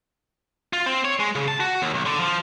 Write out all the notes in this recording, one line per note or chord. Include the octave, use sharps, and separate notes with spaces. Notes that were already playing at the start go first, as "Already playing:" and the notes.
F4
C4
C#5
G#3
C#3
A5
F#4
D#2
B1
D3
F3